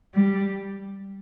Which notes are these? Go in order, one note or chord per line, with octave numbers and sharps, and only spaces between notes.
G3